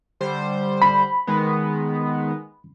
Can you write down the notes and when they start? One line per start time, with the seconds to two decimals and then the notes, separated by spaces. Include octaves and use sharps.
0.20 D3 G3 C5
0.82 B5
1.27 D#3 G#3 B3